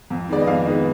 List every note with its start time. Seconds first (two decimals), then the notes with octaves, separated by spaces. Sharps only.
0.10 F2
0.29 D#3 G#3 B3 D5
0.40 D#5
0.47 F2 F5
0.65 D#3 G#3 B3 D#5